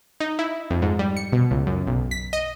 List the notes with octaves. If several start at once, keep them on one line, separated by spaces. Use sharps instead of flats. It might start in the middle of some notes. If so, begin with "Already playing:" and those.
D#4
E4
F2
G#2
G3
C#7
B2
C#2
F#2
B1
B6
D#5